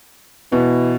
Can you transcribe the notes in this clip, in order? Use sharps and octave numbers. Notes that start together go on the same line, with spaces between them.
B2 E3